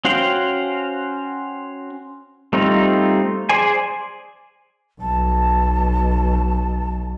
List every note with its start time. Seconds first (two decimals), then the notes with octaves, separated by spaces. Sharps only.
0.05 C#4 F#4 C5 F5 G5
2.53 G3 A3 C4 D#4 F4
3.49 G#4 C5 D5 G#5
5.01 B1 A5